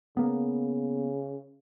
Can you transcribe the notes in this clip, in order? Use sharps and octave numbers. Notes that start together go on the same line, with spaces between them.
C#3 A#3 B3